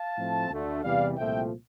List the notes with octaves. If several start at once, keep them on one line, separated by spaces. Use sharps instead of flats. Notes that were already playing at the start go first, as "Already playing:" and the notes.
Already playing: F5 A5
A2 F3 A3 C4
D2 D3 A3
E2 C3 E3 G3 D5 F5
C2 A#2 F3 A3 E5 G5